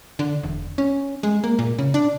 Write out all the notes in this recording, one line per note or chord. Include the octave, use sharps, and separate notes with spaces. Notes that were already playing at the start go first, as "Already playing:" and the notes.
D3
E1
C#4
G#3
A#3
A#2
C#3
D4